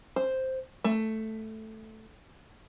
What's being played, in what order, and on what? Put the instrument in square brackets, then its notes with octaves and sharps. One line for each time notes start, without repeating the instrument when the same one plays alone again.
[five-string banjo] C5
A3